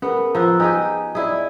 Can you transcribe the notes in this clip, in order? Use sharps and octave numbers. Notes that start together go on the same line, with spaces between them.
B3 C#4 G#4 A#4
F3 A#5 E6 F#6
D#4 G4 G#4 G5 G#5
E4 G#4 D5 D#5